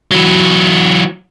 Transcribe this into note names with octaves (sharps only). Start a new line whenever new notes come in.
E3 F#3